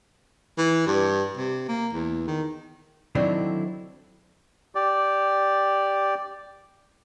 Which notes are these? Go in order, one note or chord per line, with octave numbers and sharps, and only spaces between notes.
E3
G2
C3
A#3
E2
D#3
D3 D#3 F#3 C4 D4 E4
G4 D5